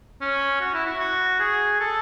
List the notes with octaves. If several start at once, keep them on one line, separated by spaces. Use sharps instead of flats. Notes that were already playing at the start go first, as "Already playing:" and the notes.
C#4
F#4
E4
F#4
F#4
G#4
A4